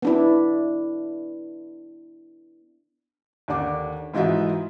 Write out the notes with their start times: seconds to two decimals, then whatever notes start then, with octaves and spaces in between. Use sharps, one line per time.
0.02 B3 D4 E4
3.48 D#2 D3 D4 D6
4.14 G#2 E3 D#4 F4 F#4 E5